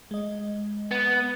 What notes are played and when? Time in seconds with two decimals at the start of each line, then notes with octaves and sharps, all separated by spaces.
0.11 G#3 D#5
0.91 B3